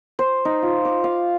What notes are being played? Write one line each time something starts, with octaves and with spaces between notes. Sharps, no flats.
C5
D#4
F4
D6
F5